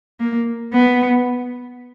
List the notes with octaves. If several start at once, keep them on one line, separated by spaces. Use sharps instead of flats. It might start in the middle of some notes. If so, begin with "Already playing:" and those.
A#3
B3